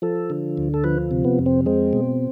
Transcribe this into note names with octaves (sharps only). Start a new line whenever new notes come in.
F3 A4
D3
D2
A4
F3 B4
C3
B3
F2
C4
G#3 C4
B2